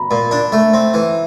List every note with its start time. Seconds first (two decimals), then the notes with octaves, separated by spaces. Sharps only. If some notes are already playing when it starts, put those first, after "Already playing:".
Already playing: A#5 B5
0.11 A#2
0.31 D4
0.52 A3
0.74 C4
0.94 E3